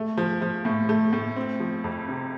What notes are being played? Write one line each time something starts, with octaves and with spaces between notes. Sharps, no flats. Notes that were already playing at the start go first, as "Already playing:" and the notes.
Already playing: A3
F3
F3
A2
A3
A2
C4
F3
F2
C3